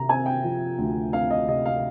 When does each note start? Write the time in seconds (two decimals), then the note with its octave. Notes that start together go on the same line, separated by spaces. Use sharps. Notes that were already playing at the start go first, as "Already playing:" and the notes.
Already playing: C3 A#5
0.09 C4 G#5
0.26 G5
0.44 F3
0.78 D2
1.13 C4 F5
1.30 D#5
1.48 C3 D#5
1.66 F5